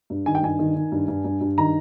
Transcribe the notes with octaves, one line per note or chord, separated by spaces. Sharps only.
G2
D#3 G#5
G5
G2 G#5
D#3
D#3
G2
G2
G2
G2
D#3 A#5